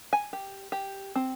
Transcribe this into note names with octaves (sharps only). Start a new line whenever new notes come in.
G#5
G4
G4
C4